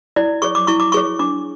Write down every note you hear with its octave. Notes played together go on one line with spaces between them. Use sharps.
E4 D5
G#4 C#5 C#6
D6
E4 C#6
D6
G#4 C#5 C#6
D4 D6